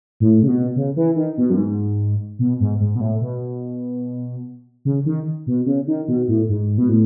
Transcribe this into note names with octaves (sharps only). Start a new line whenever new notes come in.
A2
C#3
B2
C#3
E3
D#3
B2
F#2
G#2
B2
G#2
G#2
B2
A2
B2
C#3
D#3
B2
C#3
D#3
B2
A2
G#2
B2
A2